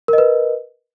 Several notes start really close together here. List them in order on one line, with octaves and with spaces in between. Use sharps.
A#4 D#5 B4